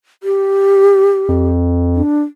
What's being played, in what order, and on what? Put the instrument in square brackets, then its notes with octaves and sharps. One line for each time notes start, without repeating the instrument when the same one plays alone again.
[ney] G4
[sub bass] F2
[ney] D4